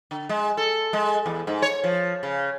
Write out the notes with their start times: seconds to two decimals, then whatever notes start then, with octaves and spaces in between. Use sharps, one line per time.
0.11 D3
0.29 G#3
0.57 A4
0.93 G#3
1.26 E2
1.47 G#2
1.62 C#5
1.84 F3
2.23 C#3